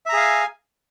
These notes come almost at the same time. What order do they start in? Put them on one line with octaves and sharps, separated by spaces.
E5 A#5 G#4 F5 G#5